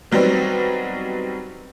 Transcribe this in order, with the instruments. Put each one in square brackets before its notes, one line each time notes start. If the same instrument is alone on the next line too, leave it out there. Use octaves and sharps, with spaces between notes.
[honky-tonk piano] D#3 F#3 G3 B3 C4